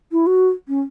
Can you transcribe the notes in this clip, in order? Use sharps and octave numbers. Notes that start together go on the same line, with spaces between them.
E4
F#4
C#4